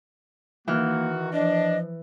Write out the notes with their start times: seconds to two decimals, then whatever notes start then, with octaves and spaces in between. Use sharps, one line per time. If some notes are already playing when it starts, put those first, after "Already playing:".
0.68 D#3 E3 A#3 F#4 F6
1.33 F3 D4 D#5